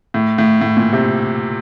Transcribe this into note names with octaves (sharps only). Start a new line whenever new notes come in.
A2
A2
A2
A#2
C3